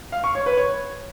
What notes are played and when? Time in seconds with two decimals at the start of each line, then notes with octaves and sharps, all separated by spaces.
0.12 F5
0.24 C#6
0.35 C#5
0.46 B4
0.57 C#5